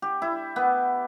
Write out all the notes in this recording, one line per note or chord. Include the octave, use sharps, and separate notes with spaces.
G4
E4
B3